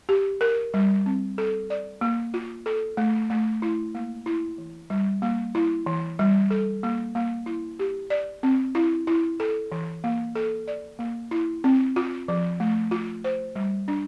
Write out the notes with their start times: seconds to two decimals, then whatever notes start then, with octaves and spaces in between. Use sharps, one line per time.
0.09 G4
0.41 A#4
0.74 G3
1.06 C4
1.38 A4
1.70 D5
2.01 A#3
2.34 F4
2.66 A4
2.97 A3
3.30 A3
3.62 E4
3.95 A#3
4.26 E4
4.58 E3
4.90 G3
5.22 A#3
5.55 E4
5.86 E3
6.19 G3
6.51 A4
6.83 A#3
7.15 A#3
7.46 E4
7.79 G4
8.10 D5
8.43 C4
8.75 E4
9.07 E4
9.40 A4
9.72 E3
10.04 A#3
10.36 A4
10.68 D5
10.99 A#3
11.31 E4
11.64 C4
11.96 F4
12.28 F3
12.60 A3
12.91 F4
13.24 C5
13.55 G3
13.88 D4